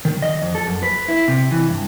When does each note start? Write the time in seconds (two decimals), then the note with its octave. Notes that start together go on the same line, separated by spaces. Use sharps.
0.05 D#3
0.22 D#5
0.42 F2
0.55 A4
0.67 F#2
0.83 B4
1.08 E4
1.28 C3
1.51 E3
1.68 G2